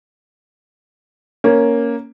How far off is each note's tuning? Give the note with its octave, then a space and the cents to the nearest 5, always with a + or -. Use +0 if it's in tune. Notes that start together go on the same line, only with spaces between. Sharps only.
A#3 +0 C#4 +0